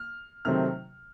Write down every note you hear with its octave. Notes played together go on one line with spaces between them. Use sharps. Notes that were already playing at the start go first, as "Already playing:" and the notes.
Already playing: F6
C3 D#3 F#3 A3 C4 F6